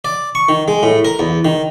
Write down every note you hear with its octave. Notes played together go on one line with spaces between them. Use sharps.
D5
C#6
D#3
G#3
A2
A#4
E2
D#3